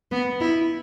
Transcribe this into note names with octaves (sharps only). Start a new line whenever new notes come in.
B3
E4